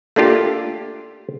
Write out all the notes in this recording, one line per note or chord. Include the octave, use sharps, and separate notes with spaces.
A3 A#3 D4 F4 G4